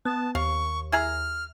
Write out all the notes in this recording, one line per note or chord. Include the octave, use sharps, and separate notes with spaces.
B3 A5
D#2 F5 C#6
E4 G#4 A#5 F6